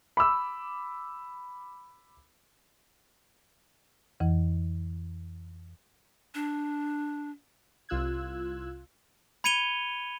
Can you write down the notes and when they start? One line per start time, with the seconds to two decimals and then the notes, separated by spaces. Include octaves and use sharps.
0.17 B5 D6 E6
4.20 F2 E3
6.34 D4
7.89 C2 F4 E6 F#6 G#6
9.44 B5 G#6 C#7 D#7 F7 G7